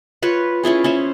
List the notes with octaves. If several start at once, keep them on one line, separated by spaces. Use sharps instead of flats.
F4 B4 C#5
C#4 E4 F4 G#4
C#4 E4 C5